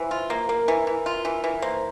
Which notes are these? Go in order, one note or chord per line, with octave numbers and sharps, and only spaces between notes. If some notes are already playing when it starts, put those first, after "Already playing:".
Already playing: E3 C5
F4
A#3
A#3 A#4
E3
E3
F4
E3
E3
A#3 C5